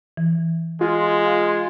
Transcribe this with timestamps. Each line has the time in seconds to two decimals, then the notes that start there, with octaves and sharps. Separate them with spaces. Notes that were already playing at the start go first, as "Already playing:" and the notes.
0.17 E3
0.81 G#3 F4